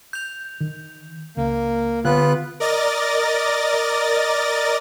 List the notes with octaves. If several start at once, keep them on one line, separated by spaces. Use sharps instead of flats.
G6 F7
D#3
C#2 A#3
D3 B3 F4 F#6
A#4 D5 D#5 A6 A#6